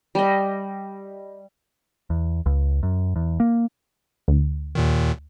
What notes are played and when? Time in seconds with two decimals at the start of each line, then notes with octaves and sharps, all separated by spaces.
0.15 G3 D#5
2.10 E2
2.46 C#2
2.83 F#2
3.16 E2
3.40 A#3
4.28 D2
4.75 D#2 A#2 D#3